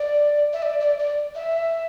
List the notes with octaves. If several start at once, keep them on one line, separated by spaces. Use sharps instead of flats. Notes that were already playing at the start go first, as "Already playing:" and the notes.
Already playing: D5
E5
D5
D5
D5
E5